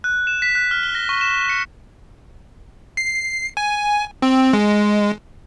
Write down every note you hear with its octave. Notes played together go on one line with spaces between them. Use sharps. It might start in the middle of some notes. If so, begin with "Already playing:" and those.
F#6
E7
B6
F#6
F6
G7
A#6
C#6
E7
C#7
C7
G#5
C4
G#3